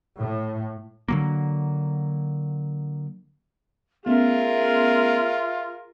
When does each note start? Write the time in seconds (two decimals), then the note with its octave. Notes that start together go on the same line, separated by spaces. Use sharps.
0.17 A2
1.08 D3 F#3 A#3
4.06 A3 B3 C#4 F4 G#4 A#4 E5